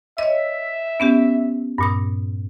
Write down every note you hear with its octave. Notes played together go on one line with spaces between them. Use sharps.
C#5 D#5 E5
B3 C#4 G4
G2 A#2 D#6